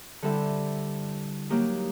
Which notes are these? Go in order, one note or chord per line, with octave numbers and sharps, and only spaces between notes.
D3 G3 C4 E4 A4
F#3 A#3 D#4 G4